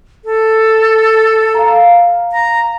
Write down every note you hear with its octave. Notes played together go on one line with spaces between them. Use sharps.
A4
F5 G5 A#5
A#5